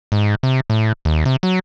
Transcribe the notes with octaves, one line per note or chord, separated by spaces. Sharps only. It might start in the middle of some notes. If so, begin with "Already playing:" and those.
G#2
C3
A2
D#2
C3
F#3